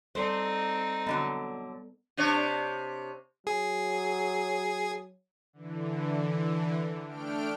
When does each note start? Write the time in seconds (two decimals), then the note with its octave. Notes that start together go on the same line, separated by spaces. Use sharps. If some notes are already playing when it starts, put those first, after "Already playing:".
0.15 G3 C4 D#4 A4 C5 D5
1.07 B2 D3 F#3 B3
2.17 C3 D4 C#5
3.47 F#3 G#4
5.53 D3 E3
7.05 A3 D4 G5 F6 D7